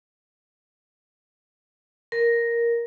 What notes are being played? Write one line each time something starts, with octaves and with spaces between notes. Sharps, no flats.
A#4